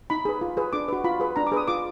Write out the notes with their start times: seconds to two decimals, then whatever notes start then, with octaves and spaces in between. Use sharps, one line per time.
0.10 D#4 B5
0.25 G#4 B4
0.41 F4
0.57 G#4 B4
0.73 D4 D6
0.88 F#4 B4
1.04 F4 B5
1.20 G#4 B4
1.36 D4 A#5
1.47 D6
1.52 G#4 B4 D#6
1.68 F4 D6